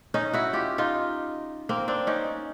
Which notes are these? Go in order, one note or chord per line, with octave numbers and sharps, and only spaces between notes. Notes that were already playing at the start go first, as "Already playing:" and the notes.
C#4 D#4
E4 F#4
F4 G4
D#4 F4
A#3 C4
C4 D4
C#4 D#4